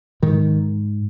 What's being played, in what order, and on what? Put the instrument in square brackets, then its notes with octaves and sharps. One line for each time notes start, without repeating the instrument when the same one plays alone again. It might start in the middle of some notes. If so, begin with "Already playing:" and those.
[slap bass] G#2 D#3